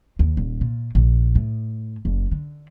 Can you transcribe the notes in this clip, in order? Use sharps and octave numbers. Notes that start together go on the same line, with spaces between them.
D#2
D#1
A#2
A#1
A2
F#1
D3